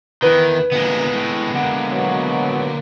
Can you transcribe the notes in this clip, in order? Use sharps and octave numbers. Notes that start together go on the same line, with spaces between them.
E2 D#3 E3 B4
D2 A#2 G#3 B3
A2
D3 A#3 F#5
B2 F#3